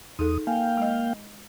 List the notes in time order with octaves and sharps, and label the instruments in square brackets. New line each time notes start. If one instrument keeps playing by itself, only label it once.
[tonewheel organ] E2 D#6 [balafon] D#4 G#4 A4
[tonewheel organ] A#3 F5 G5 [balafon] G#5
[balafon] G#3 D#5